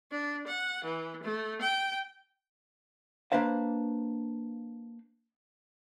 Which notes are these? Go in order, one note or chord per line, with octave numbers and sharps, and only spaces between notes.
D4
F#5
E3
A3
G5
A#3 D4 B4 C5 F5